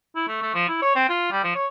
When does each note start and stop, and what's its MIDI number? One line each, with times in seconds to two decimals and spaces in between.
0.16 0.24 64
0.28 0.38 57
0.42 0.53 57
0.54 0.65 53
0.68 0.80 64
0.82 0.93 73
0.96 1.08 60
1.09 1.28 65
1.31 1.42 55
1.44 1.53 53
1.55 1.66 73